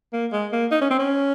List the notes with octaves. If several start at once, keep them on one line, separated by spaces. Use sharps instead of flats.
A#3
G#3
A#3
D#4
C#4
C4
C#4